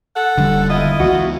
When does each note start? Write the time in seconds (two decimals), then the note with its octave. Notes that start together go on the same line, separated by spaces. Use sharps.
0.15 A4 F#5
0.37 E1 D3 G3
0.68 E4 F4 D#5
1.00 C#2 E3 B3 F#4